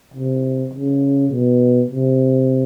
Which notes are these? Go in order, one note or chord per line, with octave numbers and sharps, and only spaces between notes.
C3
C#3
B2
C3